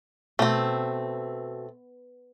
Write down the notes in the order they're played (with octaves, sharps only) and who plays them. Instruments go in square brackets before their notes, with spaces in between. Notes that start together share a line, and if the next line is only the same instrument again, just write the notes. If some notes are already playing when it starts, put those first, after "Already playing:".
[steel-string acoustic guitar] B2 [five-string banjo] A3 C4